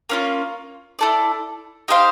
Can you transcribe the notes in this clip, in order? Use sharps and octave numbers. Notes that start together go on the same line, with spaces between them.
A#3 C#4 F4
E4 A4 D5
D#4 G4 C5 F5